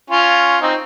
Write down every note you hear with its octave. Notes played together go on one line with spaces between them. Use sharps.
C#4 F4
C4 D#4